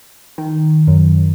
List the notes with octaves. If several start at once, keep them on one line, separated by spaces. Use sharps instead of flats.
D#3
F#2